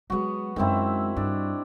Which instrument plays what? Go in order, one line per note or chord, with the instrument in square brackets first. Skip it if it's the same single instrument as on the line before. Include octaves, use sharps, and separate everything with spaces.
[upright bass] F#3 G#3 [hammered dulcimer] B3 F#4
[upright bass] F#2 G#3 [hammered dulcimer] D#3 C4 E4
[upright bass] G2 [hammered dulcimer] D4